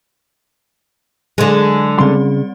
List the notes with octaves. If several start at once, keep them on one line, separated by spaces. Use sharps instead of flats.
D3 F#3 G#3 C6
C#3 G3 C4 D5 C6